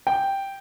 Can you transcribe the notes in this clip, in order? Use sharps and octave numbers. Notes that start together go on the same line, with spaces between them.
G5